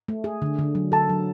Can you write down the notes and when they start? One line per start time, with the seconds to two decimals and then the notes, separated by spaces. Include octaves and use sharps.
0.08 A3
0.24 G#4
0.42 D3
0.59 D3
0.75 F#3
0.92 A4 A5
1.09 F#3